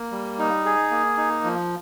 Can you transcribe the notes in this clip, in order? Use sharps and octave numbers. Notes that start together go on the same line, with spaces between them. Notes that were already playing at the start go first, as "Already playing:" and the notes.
Already playing: A#3
G3
D#4
G#4
A#3
D#4
F3